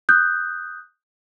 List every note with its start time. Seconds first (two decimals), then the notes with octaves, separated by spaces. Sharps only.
0.09 D#6 F#6 G6